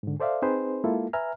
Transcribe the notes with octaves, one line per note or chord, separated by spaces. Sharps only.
G#2 D3
A4 C5 D5 E5 F5
C4 D#4 G#4 B4 C5
G#3 A#3 E4 F4 A4
B4 E5 G#5 A#5 F6